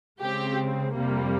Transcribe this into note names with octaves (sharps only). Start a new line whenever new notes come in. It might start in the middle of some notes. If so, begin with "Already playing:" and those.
C#3 G#3 C4 G4
F2 C3 G3 A#3